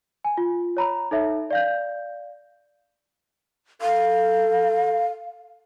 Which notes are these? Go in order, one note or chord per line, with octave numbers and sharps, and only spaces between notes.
G#5
F4
C#5 A#5 B5
D#4 A4 C#5 E5
D5 F5 G6
A4 F5